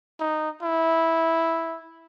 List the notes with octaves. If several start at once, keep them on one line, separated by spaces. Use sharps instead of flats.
D#4
E4